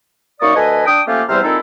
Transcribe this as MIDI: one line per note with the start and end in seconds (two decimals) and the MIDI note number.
0.41 0.54 42
0.41 0.54 58
0.41 0.54 63
0.41 0.54 74
0.41 0.54 85
0.41 0.54 87
0.55 0.86 38
0.55 0.86 69
0.55 0.86 71
0.55 0.86 75
0.55 0.86 80
0.86 0.99 62
0.86 0.99 79
0.86 0.99 87
1.07 1.22 53
1.07 1.22 57
1.07 1.22 58
1.07 1.22 61
1.07 1.22 65
1.07 1.22 67
1.28 1.40 40
1.28 1.40 48
1.28 1.40 55
1.28 1.40 72
1.28 1.40 76
1.28 1.40 89
1.44 1.58 46
1.44 1.58 56
1.44 1.58 60
1.44 1.58 63
1.44 1.58 64
1.44 1.58 69